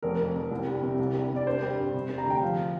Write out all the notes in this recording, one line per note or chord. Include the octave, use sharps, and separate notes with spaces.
F1 A#4
F2
F2
C2
G3
C3
C2
G3
C3
D5
D4 C5
G3
G2
C3
G3
A#5
D2 G5
F3 F5